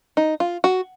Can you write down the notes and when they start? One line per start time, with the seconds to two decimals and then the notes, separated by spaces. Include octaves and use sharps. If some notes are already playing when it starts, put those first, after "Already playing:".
0.17 D#4
0.40 F4
0.64 F#4